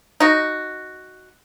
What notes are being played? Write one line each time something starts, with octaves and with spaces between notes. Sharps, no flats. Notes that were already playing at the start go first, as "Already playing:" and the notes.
D#4 F#4